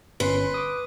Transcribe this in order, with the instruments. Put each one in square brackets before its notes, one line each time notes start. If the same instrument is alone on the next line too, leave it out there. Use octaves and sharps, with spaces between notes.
[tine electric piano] G1 C#4 C6 [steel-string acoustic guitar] B4
[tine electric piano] D6 D#6